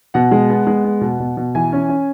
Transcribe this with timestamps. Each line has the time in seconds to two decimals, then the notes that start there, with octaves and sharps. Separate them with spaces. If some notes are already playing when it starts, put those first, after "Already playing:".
0.14 B2 F#5
0.31 G#3
0.50 B3
0.67 G#3
0.84 B3
1.01 B2
1.20 B2
1.37 B2
1.55 E3 G#5
1.72 C#4
1.89 C#4